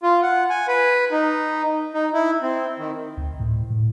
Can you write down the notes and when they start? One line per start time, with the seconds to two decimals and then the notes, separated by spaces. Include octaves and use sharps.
0.03 F4
0.22 F#5
0.50 G#5
0.68 B4
1.11 D#4
1.94 D#4
2.13 E4
2.42 C4
2.79 D#3
3.17 D2
3.40 A2
3.70 A2